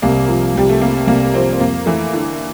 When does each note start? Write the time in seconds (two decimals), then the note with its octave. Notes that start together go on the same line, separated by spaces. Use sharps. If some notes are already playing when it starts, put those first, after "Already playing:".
0.02 C2 A#3
0.28 F3
0.55 C2 G3
0.69 A3
0.81 C3 A#3
1.07 C2 A#3
1.34 F3 C4
1.52 C4
1.60 F2 A#3
1.86 E3 A3
2.13 D3 E4